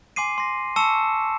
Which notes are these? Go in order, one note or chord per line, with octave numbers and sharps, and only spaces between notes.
G#5 C6 D6 C7 D#7
C6 A#6
A5 C#6 E6 C#7 E7